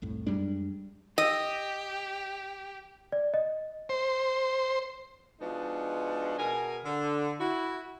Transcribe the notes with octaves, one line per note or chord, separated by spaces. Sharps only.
C2 F2 A2
F#2 G3 G#3 D4
G4 D#5
D5
D#5
C5
F3 G#3 B3 D4 D#4 F#4
B2 G#4 A#4 G#5
D3
E4 F#4